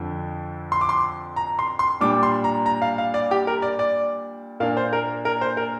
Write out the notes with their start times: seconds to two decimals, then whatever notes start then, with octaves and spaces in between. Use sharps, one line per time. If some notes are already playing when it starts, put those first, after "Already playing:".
Already playing: F2 D3 F3
0.72 C6
0.81 D6
0.89 C6
1.36 A#5
1.59 C6
1.79 C6
2.01 A#2 G3 D4 D6
2.23 C6
2.44 A#5
2.66 A#5
2.82 F5
2.98 F5
3.14 D5
3.31 G4
3.47 A#4
3.62 D5
3.79 D5
4.60 A#2 A#3 D4 F5
4.77 C5
4.93 A#4
5.25 A#4
5.41 C5
5.57 A#4